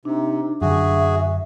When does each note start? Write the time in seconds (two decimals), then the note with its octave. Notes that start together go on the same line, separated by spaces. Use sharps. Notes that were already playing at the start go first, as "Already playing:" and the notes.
0.05 C3 D4 D#4
0.62 F#2 D3 F#4 G#4 E5